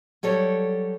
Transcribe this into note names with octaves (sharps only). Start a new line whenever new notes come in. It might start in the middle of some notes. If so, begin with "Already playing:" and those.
F#3 G3 A4 C#5